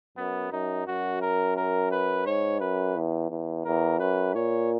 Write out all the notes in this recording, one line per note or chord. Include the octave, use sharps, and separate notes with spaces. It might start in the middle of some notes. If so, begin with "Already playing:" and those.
F#2 B3
F#2 D#4
F#2 F#4
A#4
A#4
B4
G#2 C#5
F#2 B4
E2
E2
E2 A#4
F#2 B4
A#2 C#5